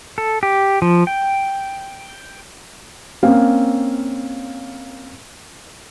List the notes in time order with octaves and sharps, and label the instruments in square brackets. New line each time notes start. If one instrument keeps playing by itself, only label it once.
[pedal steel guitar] A4
G4
F3
G5
[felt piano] A#3 C4 C#4 F5